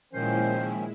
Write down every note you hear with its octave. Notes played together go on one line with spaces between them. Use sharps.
A#2 D#3 F3 G#3 C#4 E4 C5